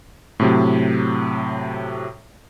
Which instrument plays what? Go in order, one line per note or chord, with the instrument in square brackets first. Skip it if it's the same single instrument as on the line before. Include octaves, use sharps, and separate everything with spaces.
[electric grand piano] A2 C3 F#3